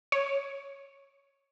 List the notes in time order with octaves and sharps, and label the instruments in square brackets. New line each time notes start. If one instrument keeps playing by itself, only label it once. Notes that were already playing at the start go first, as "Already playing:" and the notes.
[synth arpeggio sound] C#5